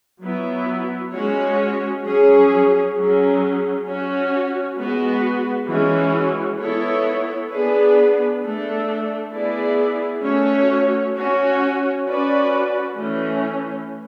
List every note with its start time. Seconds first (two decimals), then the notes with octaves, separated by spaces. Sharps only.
0.23 F#3 B3 E4
1.14 G#3 C#4 F#4 C#5
2.05 F#3 C#4 G#4 C#5
2.96 F#3 C#4 G#4
3.86 C#4 F#4 C#5
4.77 G#3 B3 F#4 B4
5.68 E3 G#3 C#4 F#4
6.59 B3 E4 A4 C#5
7.51 B3 D4 G#4 B4
8.42 A3 D4 A4
9.33 B3 E4 G#4 D5
10.24 A3 C#4 F#4 C#5
11.15 C#4 F#4 C#5
12.06 C#4 F#4 B4 D5
12.97 E3 A3 C#4